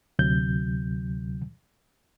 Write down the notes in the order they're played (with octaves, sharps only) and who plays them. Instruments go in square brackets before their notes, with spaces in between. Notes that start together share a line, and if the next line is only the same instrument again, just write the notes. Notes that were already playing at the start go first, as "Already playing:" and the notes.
[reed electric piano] D2 C3 F#3 G6